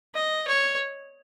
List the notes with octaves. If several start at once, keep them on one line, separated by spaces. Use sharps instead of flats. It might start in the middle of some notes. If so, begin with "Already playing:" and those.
D#5
C#5